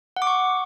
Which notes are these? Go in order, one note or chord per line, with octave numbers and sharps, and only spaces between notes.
F#5
D6
C#6